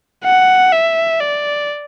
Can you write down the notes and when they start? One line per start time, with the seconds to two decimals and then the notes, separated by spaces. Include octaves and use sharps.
0.24 F#5
0.72 E5
1.20 D5